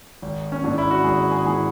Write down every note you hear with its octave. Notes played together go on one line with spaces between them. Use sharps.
G#1
C#4
G#2 E3 D4
E4
F#4
G#1 G#4
G#4
G#2 E3 G#4